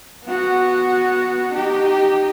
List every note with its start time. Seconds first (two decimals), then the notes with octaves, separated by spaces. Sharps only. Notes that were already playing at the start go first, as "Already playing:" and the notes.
0.25 B3 F#4
1.53 D#4 G4